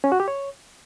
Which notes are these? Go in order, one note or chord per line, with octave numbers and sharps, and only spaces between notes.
C#4
F#4
G4
C#5